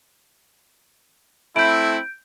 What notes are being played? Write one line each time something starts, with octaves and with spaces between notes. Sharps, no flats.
A3 C4 E4 G6 D7